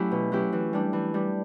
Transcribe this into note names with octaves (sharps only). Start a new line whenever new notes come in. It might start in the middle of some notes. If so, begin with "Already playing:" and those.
Already playing: F#3 A3 C#4 E4 G4
B2
F#3 C#4 E4 G4
E3
G3 D4
E3
G3 D4